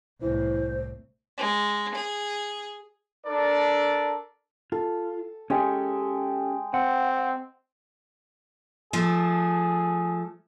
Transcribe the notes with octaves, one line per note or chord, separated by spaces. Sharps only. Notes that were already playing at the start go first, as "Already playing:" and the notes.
C2 A2 E3 C5
G#3
G#4
D4 A4 A#4 D5
F4 A4
G#3 C#4 G4 A4 G5 G#5
C4 F#5
F3 A3 G#4